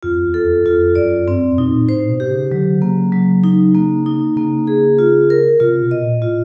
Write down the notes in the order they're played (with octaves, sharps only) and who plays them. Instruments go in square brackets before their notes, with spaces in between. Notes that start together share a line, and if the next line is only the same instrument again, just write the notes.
[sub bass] F2 [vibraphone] F4
[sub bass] E2
[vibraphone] A4
[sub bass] F2
[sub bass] F2 [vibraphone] F4
[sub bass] F#2 [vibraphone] D5
[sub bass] G2 [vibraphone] C4
[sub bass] F2
[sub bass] B2 [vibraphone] D#4
[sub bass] A#2
[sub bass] A2 [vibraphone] C5
[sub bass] B2
[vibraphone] G4
[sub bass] C#3
[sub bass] D3 [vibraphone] F#3
[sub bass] C#3 [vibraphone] A#3
[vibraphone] F#3
D#4
A#3
D#4
[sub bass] C#3 [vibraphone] A#3
[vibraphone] G#4
F4
A#4
[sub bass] C3 [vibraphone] F4
[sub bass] B2
[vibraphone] D#5
[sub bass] A#2
[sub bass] A2 [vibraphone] F4